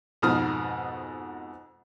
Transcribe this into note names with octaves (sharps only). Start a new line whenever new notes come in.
F2 G#2 B2 A#5 D#6 F6